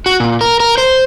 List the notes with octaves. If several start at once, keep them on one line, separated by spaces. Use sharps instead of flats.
F#4
A#2
A#4
A#4
C5